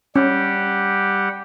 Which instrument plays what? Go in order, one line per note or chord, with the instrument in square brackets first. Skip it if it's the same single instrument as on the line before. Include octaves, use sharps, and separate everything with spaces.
[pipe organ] G3 G4 F#5 [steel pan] C#4